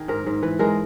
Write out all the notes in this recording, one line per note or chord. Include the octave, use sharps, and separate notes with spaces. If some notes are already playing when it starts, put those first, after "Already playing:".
Already playing: D#3 G#4
G#2 A#4
G#2
E3 B4
G#3 A#4